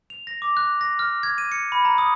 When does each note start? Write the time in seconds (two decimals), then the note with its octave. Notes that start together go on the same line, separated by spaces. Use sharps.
0.10 F7
0.27 A#6
0.42 D6
0.57 F#6
0.81 A#6
0.99 F6
1.23 G#6
1.38 D#7
1.52 C#7
1.72 B5
1.85 A#5
1.98 D#6